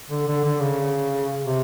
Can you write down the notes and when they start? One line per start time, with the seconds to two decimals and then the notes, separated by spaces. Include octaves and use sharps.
0.10 D3
0.28 D3
0.45 D3
0.60 C#3
1.44 C3